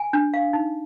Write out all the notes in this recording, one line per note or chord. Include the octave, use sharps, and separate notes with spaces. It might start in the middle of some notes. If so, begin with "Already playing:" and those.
Already playing: G#5
D4
F5
D#4